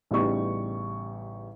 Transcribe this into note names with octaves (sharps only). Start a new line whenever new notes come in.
A1 C#3 G3 B3 D#4 C#6